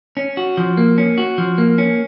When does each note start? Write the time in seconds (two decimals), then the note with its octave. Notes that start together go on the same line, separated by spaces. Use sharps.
0.17 C#4
0.37 F#4
0.57 F3
0.77 A#3
0.98 C#4
1.18 F#4
1.38 F3
1.58 A#3
1.78 C#4